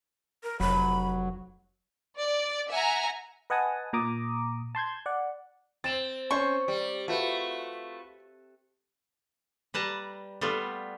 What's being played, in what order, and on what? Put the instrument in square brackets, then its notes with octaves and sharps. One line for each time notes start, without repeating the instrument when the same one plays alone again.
[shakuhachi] A#4
[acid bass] F1 [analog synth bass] F#3 [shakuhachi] B5
[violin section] D5
E5 F#5 G#5 A#5
[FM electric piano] B4 D#5 F#5 G#5 A5 D#6
A#2 A#5 D6 D#6
A5 C6 G6 G#6
D5 F#5
[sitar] C4 [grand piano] A6 E7 F#7
[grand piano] C#4 C5 C#5 [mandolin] C#6
[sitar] G3 [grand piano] D5
[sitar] A3 [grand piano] F4 F#4 B4
[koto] G3 B4 A5 A#5
G3 A3 B3 F4